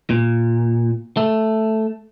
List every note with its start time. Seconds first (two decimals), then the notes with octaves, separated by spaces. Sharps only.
0.10 A#2
1.17 A3